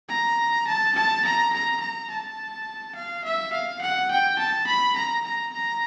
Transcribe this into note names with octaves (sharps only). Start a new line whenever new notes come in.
A#5
A5
A5
A#5
A#5
A#5
A5
F5
E5
F5
F#5
G5
A5
B5
A#5
A#5
A#5